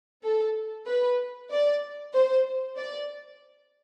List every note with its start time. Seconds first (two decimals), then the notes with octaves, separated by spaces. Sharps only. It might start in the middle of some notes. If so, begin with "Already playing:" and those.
0.24 A4
0.87 B4
1.51 D5
2.14 C5
2.77 D5